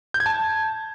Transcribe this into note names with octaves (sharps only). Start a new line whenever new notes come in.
G6
G#6
A5